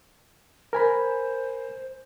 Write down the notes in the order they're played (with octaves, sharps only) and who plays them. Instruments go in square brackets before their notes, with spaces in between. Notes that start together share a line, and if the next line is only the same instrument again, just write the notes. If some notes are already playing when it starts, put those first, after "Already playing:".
[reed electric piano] A#4 G#5 B5 [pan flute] C5